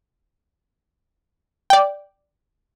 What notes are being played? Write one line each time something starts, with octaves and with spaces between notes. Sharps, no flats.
D5 G5